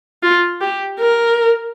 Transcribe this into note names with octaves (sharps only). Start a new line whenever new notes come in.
F4
G4
A#4